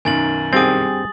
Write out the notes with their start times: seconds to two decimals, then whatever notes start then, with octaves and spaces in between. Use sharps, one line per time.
0.05 B1 F#2 D#3 G#5 A6 F#7
0.53 G2 C4 G4 G#4 D#6 A6